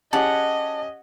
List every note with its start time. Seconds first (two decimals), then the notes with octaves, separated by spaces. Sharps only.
0.13 C#4 G4 G#4 D#5 F#5 A5